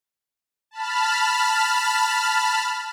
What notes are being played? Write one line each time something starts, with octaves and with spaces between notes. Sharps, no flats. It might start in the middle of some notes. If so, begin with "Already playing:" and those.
A5 B5 F6